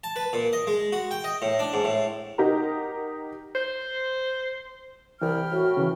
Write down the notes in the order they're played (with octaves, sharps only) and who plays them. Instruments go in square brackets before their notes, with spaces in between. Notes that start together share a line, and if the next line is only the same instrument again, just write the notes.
[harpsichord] A5
B4
A#2
D#5
G#3
F#4
G5
D#5
A2
D4
G#2
A2
[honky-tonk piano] D#4 G4 A#4 D#5 F#5 A#5
[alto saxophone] C5
[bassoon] C2 [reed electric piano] E3 [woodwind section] G5 B5 F6
[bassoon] A2 [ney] F#4
[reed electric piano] C#3 E3